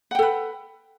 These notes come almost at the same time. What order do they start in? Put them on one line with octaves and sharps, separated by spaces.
F#5 G5 A4 B4